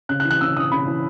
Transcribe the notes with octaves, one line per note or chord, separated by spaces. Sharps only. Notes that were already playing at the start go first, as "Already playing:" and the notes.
C#3 F#6
F#6
E3
F#6
C#3 E6
E3 D#6
C#3 B5
E3